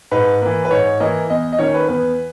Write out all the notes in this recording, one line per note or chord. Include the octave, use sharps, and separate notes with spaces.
G#2 B4
E3 A#3
B4
G#2 C#5
E3 A#3 D#5
E2 D#5
D#5
D#3 A#3 C#4 C#5
B4
E2 B4